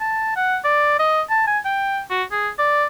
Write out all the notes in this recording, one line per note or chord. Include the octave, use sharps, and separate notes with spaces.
A5
F#5
D5
D#5
A5
G#5
G5
F#4
G#4
D5